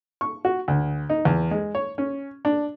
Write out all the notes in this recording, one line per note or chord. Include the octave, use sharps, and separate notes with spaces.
C#6
F#4
D2
D#4
E2
G#3
C#5
C#4
D4